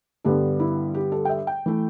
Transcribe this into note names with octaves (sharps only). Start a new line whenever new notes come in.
G2 D3 G3 B3 A4
E4
G4
A4
G5
E5
G5
E3 A3